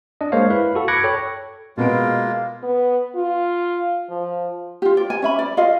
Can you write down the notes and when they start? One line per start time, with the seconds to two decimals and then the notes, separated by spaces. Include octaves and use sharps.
0.21 D4 D#5
0.32 G#3 A#3 C5 C#5 F5
0.50 E4 B4 F5 B5
0.75 F#4 A4
0.88 B5 D6 F#6 G#6 A#6 C#7
1.04 A4 C#5 G5
1.77 B2 G#3 A#3 B3 F4 D7
2.63 B3
3.15 F4
4.10 F3
4.82 F4 G4
4.97 D5
5.10 G#5
5.22 C#4 E5 B5
5.39 D5
5.57 F4 A4 D#5 F5